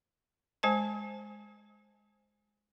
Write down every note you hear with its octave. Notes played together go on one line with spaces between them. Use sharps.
G#3 C5 G#5 A5